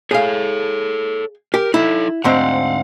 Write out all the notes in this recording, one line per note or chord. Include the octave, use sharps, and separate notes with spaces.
G#4 A4 C#5 F5
G4 A#4
D#4 E4 A4
D2 G#2 C4 F5 F#5